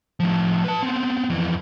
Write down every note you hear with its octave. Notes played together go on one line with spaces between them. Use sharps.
A2 F3
B4 A5
B3 C4
F2 E3